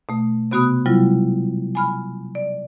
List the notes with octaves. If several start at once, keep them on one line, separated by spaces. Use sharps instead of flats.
B2 A3
C3 B3 F#4 B5 D#6 F#6
C3 F#3 G3 E4 F4
G#5 B5 F6
D5